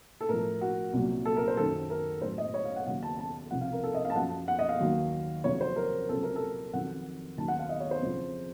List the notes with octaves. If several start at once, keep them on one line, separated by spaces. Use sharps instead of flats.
A4
A2 F3 A#4
F#4
C2 A#2 F#3
A4
A#4
C5
F#2 D#3 F#3 A4
A#4
A2 F#3 C5
D#5
C#5
F5
F#5
D#2 C#3 F#3 F#5
A5
A5
C2 C3 F3 F#5
F5
A#4
A4
D#5
F5
A5
F#2 F3 F#5
F#5
D#5
F5
D#2 D#3 F#3
F2 C3 F#3 C#5
C5
A#4
C#2 C3 F#3 A4
A#4
A4
F2 D#3 F#3 F#5
D#2 D#3 F#3 A5
F#5
F5
D#5
C#5
C5
F2 C#3 F3